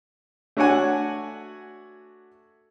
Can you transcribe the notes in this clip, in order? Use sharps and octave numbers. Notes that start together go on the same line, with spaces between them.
A3 D4 F#4 C#5 F#5 G#5